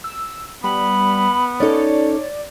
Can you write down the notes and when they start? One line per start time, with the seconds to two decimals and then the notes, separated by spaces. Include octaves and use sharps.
0.04 E6
0.64 G3 B3 B5
1.60 C#4 D#4 A4 C#5 D5